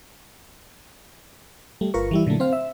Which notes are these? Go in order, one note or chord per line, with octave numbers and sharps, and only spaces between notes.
G3 A3
G1 F4 A#4 B4 C#6
E3 G3 E4
A#2 D3 F#3 A3 A#3
C4 C5 F5
E5